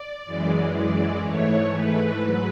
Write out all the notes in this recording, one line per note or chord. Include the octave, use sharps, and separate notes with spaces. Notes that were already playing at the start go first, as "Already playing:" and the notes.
Already playing: D5
F#2 E3 G#3
D5
G#2 E3 A3 C#5
B4
G#2 F#3